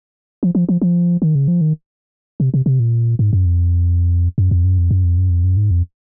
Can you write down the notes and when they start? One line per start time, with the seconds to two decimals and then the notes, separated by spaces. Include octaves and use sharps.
0.43 F3
0.55 F3
0.69 F3
0.82 F3
1.22 D#3
1.35 C#3
1.48 F3
1.61 D#3
2.40 C3
2.54 C3
2.66 C3
2.80 A#2
3.19 G#2
3.33 F#2
3.45 F2
4.38 F#2
4.51 F2
4.64 F#2
4.78 F2
4.91 F#2
5.04 F2
5.18 F#2
5.30 F2
5.44 F#2
5.57 G#2
5.71 F2